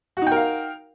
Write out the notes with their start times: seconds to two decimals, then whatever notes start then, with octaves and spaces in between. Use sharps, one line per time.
0.17 F#4
0.22 D#4
0.27 G5
0.31 A#4
0.36 F5